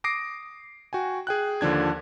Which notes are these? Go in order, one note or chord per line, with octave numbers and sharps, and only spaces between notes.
D6 D#6 A#6 C7 D7
F#4 G5 G#5
G#4 G5 F#6
D#2 D3 F3 D4 G#6